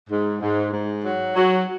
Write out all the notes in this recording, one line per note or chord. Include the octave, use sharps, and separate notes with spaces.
G#2
G#2
G#2
F#3
F#3